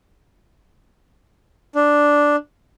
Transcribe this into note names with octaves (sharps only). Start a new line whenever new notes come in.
D4